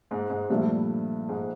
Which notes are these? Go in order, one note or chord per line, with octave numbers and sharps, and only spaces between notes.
G#2 G#3
G#2 G#3
G2 A#2 F3 G3 A3 D4
G#2 G#3